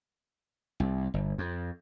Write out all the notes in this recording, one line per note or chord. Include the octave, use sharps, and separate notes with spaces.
C2
G1
F2